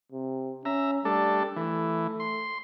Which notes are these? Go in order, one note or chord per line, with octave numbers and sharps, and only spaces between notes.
C3
C#4 E5 A#5
G3 A3 D4 A4
E3 A3
C6